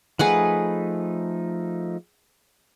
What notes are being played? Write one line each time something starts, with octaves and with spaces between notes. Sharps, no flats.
F3 A3 D#4 G#4 B4 F#5